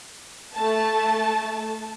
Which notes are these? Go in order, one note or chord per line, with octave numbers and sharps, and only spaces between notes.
A3 A5